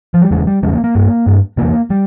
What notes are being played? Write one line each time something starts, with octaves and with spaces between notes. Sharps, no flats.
F3
G3
E2 C#3 G#3
G3
E2 C#3 G#3
A#3
A#3
G2
G2
E2 C3 A#3
G3